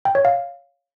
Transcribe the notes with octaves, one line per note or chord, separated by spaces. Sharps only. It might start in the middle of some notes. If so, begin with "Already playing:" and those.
G5
C#5
F5